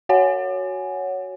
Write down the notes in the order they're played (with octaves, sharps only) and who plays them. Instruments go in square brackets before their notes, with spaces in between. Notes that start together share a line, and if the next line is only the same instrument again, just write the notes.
[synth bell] F#4 C#5 F#5 G#5